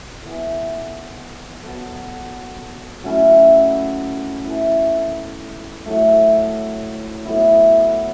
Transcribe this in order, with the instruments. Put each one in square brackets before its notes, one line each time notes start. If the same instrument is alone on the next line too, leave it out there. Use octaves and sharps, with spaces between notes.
[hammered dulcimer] E3 B3 A4
F#3 B3 A4
F#3 A3 C#4 E4
E3 A3 E4 A4
A2 F#3 A3 E4
A2 F#3 B3 E4